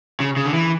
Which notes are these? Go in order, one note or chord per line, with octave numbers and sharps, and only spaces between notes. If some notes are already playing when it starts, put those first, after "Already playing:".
C#3
C#3
D3
E3